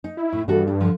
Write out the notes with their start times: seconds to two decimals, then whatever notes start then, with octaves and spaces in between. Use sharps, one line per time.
0.04 D#4
0.17 E4
0.33 A2
0.48 G2 E3 F#4 A4
0.67 D4
0.80 D3 F3